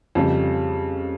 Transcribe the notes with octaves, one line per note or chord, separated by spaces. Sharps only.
F2 C#3 G3